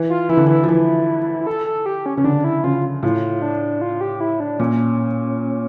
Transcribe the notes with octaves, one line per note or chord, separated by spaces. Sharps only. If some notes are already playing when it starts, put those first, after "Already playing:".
Already playing: E3
F4
E3 E4
D3
E3
E4
F3
E3
A4
A4
G4
C#4
C#3 C#4
D3 D4
E4
C#3 F4
A2 F4
D4
F4
G4
E4
D4
A#2 C#4